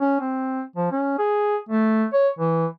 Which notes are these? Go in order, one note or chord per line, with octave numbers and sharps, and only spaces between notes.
C#4
C4
F3
C#4
G#4
A3
C#5
E3